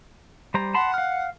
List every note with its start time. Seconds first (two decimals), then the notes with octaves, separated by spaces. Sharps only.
0.54 G3 C5 A#5
0.74 F#5 A5 B5 C6
0.94 F5 F6